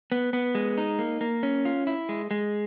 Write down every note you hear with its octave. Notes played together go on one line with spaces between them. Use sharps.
B3
B3
G#3
D#4
A#3
A#3
C#4
F4
E4
G#3
G#3